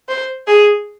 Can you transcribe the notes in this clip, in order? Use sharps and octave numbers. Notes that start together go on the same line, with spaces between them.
C5
G#4